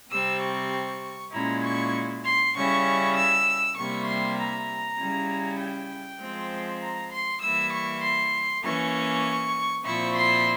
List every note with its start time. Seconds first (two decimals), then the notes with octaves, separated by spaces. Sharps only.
0.10 C3 G3 C4 E6
0.41 C#6
1.32 A#2 G#3 C#4 E4 A#5
1.63 C#6
2.24 C6
2.53 C#3 G3 C#4 E4 C#6
3.15 E6
3.75 C3 G3 A#3 E4 C#6
4.05 C6
4.36 A#5
4.97 C#3 G3 C#4 E4
5.58 G5
6.19 F3 G#3 C4
6.80 A#5
7.10 C6
7.41 E3 G3 A#3 E4 E6
7.71 C#6
8.02 C6
8.62 E3 A#3 C#4 C#6
9.84 A#2 F3 C4 E4 C#6
10.15 C6